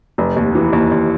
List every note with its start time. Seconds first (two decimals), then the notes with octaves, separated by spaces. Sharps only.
0.18 F1
0.36 D#2
0.55 E3
0.73 D#2
0.91 D#2